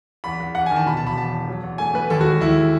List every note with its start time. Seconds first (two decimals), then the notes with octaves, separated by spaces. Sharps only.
0.24 E2 B5
0.40 E2
0.55 E2 F#5
0.66 D#3 G#5
0.76 A5
0.86 B2 B5
0.97 A5
1.02 E1 B5
1.17 E2 A5
1.32 E2
1.49 F#3
1.63 E2
1.78 A3 G#5
1.94 A3 B4
2.10 D#2 A4
2.21 F#4
2.25 G#3
2.40 D#2 E4